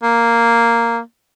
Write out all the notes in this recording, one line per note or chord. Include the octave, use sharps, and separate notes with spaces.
A#3